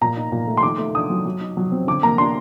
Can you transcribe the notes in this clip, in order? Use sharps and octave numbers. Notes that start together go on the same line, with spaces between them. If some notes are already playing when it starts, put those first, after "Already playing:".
A#2 A#5
D#4
A#2
A3
C6
D#3 D6
A3
D4 D#6
F#3
F#3
D#4
F#3
C4
D3 D6
A#3 A#5
D4 C6